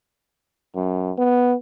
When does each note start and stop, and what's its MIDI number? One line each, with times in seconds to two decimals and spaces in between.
0.75 1.11 42
1.18 1.55 59